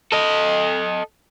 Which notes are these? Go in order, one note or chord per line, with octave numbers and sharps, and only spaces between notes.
A4 D#5